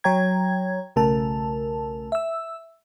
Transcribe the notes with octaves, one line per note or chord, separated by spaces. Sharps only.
F#3 C#5 G5 A#5 G#6
B1 C#3 A3 A#4 A5
E5 E6